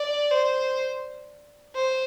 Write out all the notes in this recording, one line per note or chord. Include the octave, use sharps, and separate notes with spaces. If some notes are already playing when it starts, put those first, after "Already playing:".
Already playing: D5
C5
C5